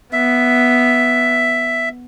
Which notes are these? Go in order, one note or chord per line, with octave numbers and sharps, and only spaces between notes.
B3 E5